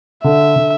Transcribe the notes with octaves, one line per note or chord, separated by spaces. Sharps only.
D3 E5
D3